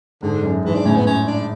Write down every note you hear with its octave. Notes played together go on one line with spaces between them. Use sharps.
G#2 D3
F#2
G#2 E3
D4
A2 C#4
B3
C#4
D4